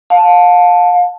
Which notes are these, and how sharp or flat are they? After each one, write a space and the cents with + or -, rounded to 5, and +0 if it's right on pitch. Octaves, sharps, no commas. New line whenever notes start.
F5 +35 A5 +0